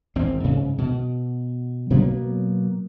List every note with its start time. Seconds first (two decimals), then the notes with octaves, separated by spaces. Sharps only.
0.15 G#1 E2 C4
0.44 G#2 C#3
0.78 B2
1.90 B2 F#3 A#3 B3